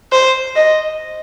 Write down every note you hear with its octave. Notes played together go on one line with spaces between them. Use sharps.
C5
D#5